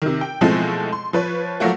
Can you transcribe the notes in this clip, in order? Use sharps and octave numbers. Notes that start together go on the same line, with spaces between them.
C3 D#3
G5
B2 E3 F3 G#3 A3 C4
C6
F3 B4 C#5
F3 F#3 A3 A#3 F#4